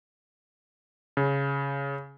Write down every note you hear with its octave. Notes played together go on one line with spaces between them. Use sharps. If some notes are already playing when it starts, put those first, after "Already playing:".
C#3